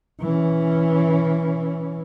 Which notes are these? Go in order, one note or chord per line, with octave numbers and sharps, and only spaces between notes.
E3 C#4